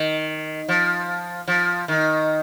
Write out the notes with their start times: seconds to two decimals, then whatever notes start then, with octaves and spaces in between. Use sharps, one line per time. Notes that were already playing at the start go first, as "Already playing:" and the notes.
Already playing: D#3
0.68 F3
1.48 F3
1.88 D#3